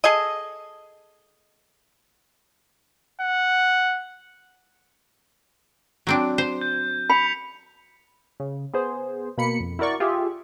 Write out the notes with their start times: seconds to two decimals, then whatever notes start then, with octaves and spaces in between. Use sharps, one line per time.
0.04 G#4 A4 D#5
3.21 F#5
6.07 F#3 C4 D4
6.38 C5
6.61 G6
7.10 B5 B6 C#7 F7
8.40 C#3
8.74 B3 G#4 C5
9.38 B2 A#3 B5 C#7
9.60 F2
9.79 E4 F#4 A#4 D5 C#6
10.00 F4 G4 G#4 E5